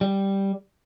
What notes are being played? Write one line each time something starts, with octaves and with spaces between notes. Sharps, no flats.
G3